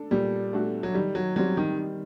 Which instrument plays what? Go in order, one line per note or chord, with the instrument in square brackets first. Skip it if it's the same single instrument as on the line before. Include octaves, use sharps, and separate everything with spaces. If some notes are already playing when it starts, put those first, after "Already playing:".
Already playing: [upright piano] D4 A4
[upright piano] A#2 [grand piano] G3
[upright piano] A3 D4 F#4 A4
[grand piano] F#3
[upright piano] D#3 [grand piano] G3
[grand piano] F#3
[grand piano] F#3 [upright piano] G3 C4 G4
[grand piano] D#3
[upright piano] D#3